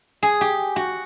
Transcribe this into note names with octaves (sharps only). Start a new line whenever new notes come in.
G#4
G4
F#4